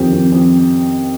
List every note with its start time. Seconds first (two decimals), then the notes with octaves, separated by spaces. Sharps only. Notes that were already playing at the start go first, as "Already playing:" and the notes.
Already playing: F2 D#3 C4 G4
0.13 F2
0.32 F2